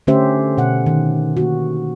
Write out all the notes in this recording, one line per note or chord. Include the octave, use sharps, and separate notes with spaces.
D3 A3 C#4 G4 C5 E5
B2 F#5
D#3
A#3 F#4